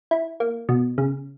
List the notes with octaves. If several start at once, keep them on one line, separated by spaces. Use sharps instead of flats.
E4
A#3
B2
C#3